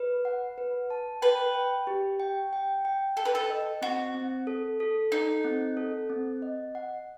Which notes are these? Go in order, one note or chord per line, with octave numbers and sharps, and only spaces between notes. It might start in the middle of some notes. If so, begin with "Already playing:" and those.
Already playing: B4
F#5
B4
A5
B4 G5
G5
G4
G5
G5
G5
A4 G5
B4
A4
D#5
C4 F#4
C4
A4
A4
D#4 A4
C4
A4
C4
D#5
F#5